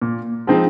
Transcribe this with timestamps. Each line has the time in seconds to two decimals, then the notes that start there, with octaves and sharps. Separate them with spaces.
0.02 A#2
0.47 F3 G#3 C4 D#4